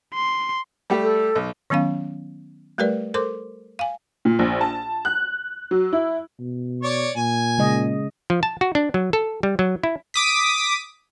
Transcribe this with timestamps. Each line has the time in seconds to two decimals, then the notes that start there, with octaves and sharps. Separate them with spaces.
0.14 C6
0.90 G3 A3 G4
1.03 A4
1.35 B1
1.70 D#3 F#3 B3 C#4 F5
2.78 G3 A3 G4 A#4 B4 D5
3.14 A4 A#4 C5 C6 D6
3.79 F5 G#5
4.25 A#2
4.39 A#1
4.61 A5
5.05 F#6
5.71 F#3
5.93 E4
6.40 B2
6.83 C#5 D5 C#6
7.16 A#2 G#5
7.58 C#3 G#3 D#5
8.30 F3
8.43 A5
8.61 F#4
8.75 D4
8.94 F#3
9.13 A4
9.43 G3
9.59 F#3
9.83 E4
10.14 D6 D#6 B6